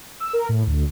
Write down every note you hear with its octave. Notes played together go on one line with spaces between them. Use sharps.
E6
A#4
A2
D2